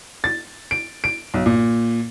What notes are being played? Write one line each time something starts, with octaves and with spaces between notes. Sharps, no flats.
A6
D7
D7
B1
A#2